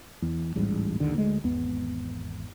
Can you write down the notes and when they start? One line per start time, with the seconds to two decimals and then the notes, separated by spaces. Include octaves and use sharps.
0.22 E2
0.55 D1 A1 G#2 G3
1.00 A#1 D#2 D3
1.15 D2 G#3
1.44 G#1 E2 B3